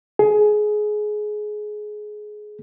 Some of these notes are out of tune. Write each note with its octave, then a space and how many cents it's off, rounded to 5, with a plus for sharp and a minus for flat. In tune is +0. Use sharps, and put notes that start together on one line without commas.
G#4 +20